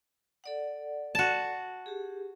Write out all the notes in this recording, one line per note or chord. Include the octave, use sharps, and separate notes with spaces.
A4 D5 F#5
F#4 A5
G4 G#4